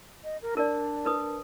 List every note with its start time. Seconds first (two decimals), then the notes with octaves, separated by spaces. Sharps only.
0.24 D#5
0.42 A#4
0.57 D4 A#4 D5
1.05 A#4 B4 D#6